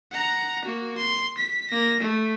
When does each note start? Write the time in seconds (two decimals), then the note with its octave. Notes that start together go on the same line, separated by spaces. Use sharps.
0.11 F#5 A#5
0.64 A#3 F#4
0.98 C6
1.37 B6
1.70 A#3 A#6
2.01 A3